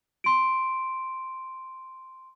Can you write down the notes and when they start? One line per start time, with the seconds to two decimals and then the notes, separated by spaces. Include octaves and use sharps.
0.24 C6 D7